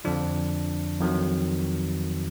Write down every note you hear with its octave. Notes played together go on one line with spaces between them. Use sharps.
F2 D3 F3 D4
F2 D#3 F#3